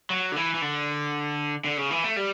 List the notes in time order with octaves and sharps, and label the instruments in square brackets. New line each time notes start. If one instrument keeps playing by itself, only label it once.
[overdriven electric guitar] F#3
D3
E3
E3
D3
D3
C#3
E3
A3
G3